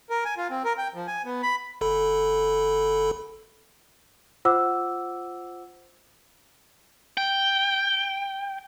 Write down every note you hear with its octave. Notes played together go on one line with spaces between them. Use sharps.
A#4
G#5
F4
C4
A#4
G5
F3
G#5
B3
B5
G1 A4 B5
F4 C5 F#5 D6 E6
G5